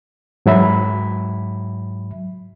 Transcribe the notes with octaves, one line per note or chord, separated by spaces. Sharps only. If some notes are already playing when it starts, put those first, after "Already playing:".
G#2 F#3 E5 B5